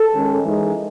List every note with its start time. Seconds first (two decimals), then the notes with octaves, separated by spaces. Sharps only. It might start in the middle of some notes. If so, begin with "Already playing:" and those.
Already playing: A4
0.14 D#3 G#3 C#4
0.43 E3 G#3 D#4